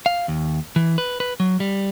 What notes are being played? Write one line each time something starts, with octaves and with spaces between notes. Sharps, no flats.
F5
D#2
E3
B4
B4
F#3
G3